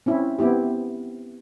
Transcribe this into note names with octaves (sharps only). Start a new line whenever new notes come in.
C4 C#4 E4
B3 C4 E4 G4